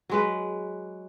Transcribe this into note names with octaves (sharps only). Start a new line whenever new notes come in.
F#3 G#3 B4